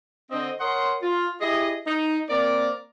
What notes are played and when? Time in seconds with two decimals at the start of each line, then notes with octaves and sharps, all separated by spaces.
0.31 D3 C4 D#5
0.60 A#4 C#5 D#5 F#5 C6
1.01 F4
1.41 E4 G4 G#4 D#5
1.86 D#4
2.29 A#3 C4 A#4 D5